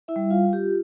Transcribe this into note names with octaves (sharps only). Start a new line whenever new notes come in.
E4 E5
G3
F4 F5
F4
G4